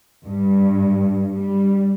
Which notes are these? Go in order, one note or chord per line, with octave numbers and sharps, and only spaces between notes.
G2
G3